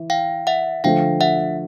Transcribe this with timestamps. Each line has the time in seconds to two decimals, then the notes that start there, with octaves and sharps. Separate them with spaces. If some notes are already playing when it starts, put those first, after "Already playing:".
Already playing: E3
0.10 F5 G5
0.47 E5 F#5
0.84 D3 F3 A3 F5 G5
1.21 E5 F#5